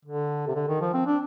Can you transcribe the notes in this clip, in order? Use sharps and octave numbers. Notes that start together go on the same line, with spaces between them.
D3
C3
D3
D#3
F3
C4
D4